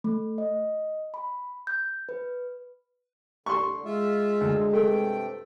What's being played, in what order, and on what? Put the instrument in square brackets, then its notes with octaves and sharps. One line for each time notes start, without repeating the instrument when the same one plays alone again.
[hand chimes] A3
D#5
B5
G6
B4
[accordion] D3 [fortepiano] C6 C#6
[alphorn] G#3 [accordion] F4 E5
[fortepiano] D2
[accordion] G2 C3 G5 [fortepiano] A3